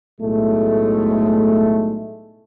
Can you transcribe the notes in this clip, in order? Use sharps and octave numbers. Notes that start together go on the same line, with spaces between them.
B1 A2 G#3 A3